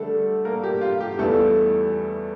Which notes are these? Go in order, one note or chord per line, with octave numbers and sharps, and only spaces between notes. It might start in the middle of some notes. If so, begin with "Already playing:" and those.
Already playing: D3 G3 A3 D4 A4
A#3 A#4
G4
F4
G4
E2 E3 G3 A3 A4